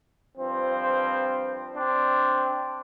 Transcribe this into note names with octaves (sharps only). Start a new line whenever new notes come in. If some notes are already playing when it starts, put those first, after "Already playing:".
G2 F3 C4
C4 D4